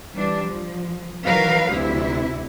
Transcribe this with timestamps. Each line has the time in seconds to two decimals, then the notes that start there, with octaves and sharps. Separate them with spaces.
0.13 E3 G3 D4
0.46 F3
1.24 D#3 E3 F#3 A#4 B4 F5
1.68 D2 C3 E4